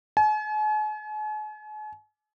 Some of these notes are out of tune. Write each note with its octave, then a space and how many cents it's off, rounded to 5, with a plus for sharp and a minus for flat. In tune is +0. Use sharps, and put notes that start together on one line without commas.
G#5 +45